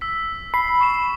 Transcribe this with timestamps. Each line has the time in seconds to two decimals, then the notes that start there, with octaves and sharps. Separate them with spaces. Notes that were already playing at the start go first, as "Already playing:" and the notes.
0.01 E6 B6
0.54 B5 C7
0.81 C#6 C7 E7